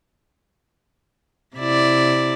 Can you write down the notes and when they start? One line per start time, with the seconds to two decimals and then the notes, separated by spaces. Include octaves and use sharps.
1.56 C3 E4 D5